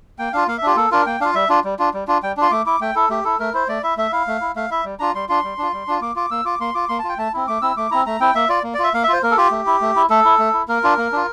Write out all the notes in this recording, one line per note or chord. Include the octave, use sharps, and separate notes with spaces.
A#3 G5
D4 F4 F5
A#3 F5
E5
D4 F4 G4
A#3 A4
D4 F4 A#4
A#3 G5
D4 F4 F5
G3 E5
D4 F4
G3
D4 F4
G3
D4 F4
G3 G5
D4 F4 C6
A3 D6
E4 D6
A3 G5
E4 A4
A3 G4
E4 A4
A3 A#4
E4 C5
A3 D5
E4 E5
A3 E5
E4 F5
A3
E4
A3 F5
E4 E5
G3
D4 F4 A#5
G3 C6
D4 F4 C6
G3
D4 F4
G3
D4 F4
A#3 D6
F4 D6
A#3 E6
F4 D6
A#3 C6
F4 D6
A#3 C6
A5
F4
G5
A3 A5
C4 E4
A3 D6
C4 E4 E6
A3 D6
C4 E4 A#5
A3 A#5
C4 E4 G5
A#3 E5
F4 D5
A#3
D5
F4 E5
A#3 F5
E5
F4 C5
A#3 A#4
A4
F4 G4
A3
E4
A3
E4
A3 A4
E4
A3
E4
A#3 A#4
D4 F4
A#3
D4 F4